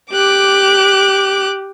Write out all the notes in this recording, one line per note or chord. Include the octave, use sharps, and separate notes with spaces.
G4 D6 F#6